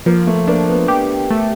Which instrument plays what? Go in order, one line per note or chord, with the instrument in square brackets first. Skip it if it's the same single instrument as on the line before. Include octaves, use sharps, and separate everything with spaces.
[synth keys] F3 [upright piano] A#3
[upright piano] A3
[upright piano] A#3 [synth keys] D4
[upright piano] B3
[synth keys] G4
A3